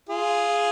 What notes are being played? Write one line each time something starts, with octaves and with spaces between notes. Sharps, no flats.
F4 G#4